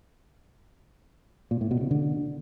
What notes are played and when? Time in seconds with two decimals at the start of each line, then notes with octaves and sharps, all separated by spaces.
1.51 A#2
1.61 A2
1.71 B2
1.81 C#3
1.91 D3